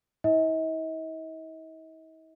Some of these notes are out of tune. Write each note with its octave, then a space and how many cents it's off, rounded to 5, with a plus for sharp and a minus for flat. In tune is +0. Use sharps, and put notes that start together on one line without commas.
E4 -45 D#5 +45